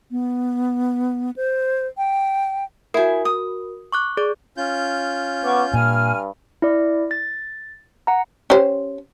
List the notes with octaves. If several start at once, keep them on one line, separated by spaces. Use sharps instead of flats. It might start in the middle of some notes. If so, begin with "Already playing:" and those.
B3
C5
G5
E4 F#4 A#4 G#5
D#6
C#6 D6 F#6
G#4 D5 D6
C#4 F4 G6
B3 C#6 D6
G2 A#2 G#5 F6
E4 D5
A6
F#5 A#5
C#4 G4 C5